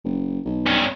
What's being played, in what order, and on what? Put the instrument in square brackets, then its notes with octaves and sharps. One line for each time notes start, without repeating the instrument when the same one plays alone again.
[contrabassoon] F#1
B1
[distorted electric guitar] G2 C#4